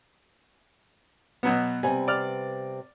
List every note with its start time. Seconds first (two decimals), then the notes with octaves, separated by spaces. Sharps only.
1.43 B2 F#3 B3
1.83 C3 G3 B3 G#5
2.08 D5 F6